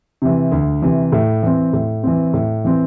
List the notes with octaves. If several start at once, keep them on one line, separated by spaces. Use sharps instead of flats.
C3 E3
D2
C3 E3
A2
E3 C4
A2
E3 C4
A2
E3 C4